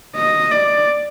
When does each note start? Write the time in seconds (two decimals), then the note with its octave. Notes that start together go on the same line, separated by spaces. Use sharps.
0.16 D#5
0.51 D5